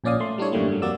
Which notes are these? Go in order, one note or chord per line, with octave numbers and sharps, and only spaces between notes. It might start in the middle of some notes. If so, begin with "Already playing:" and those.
A#1 A#2 C#4 D5 F5 D#6
A3 C6
G3 D4 E4 C#5
F#2 A2 D3 G3 A3 A#3
G2 F#3
F2 A#3 F#4 D5 E6